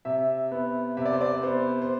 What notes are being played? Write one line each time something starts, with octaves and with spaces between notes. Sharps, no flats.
C3 E5
B3
C3 E5
D5
C5
D5
B3 C5
C5